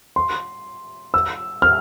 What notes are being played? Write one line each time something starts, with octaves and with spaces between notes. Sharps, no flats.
C6
E6
F6